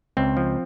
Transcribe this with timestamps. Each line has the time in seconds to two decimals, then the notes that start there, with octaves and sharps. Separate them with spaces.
0.17 C#2 C4
0.37 F3